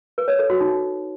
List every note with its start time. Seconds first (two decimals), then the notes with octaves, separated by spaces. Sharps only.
0.18 B4
0.28 C#5
0.39 A4
0.50 F#4
0.60 D#4